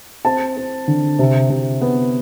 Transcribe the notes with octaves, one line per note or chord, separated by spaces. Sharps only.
C4 A5
C4
D3
C3
C3
B3